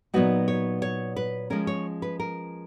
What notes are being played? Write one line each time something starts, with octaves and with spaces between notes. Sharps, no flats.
A#2 F#3 B3 D#4 F#4
C#5
C#5
B4
F3 G#3 C#4 A#4
C#5
B4
A#4